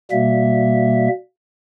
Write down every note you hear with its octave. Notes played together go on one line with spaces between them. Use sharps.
B2 G3 A#3 E5